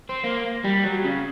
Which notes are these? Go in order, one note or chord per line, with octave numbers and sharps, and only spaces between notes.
C4
A#3
G3
F#3
C#3